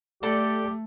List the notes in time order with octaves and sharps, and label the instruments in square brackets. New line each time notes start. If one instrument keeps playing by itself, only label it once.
[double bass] A3 [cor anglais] G4 [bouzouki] A4 D5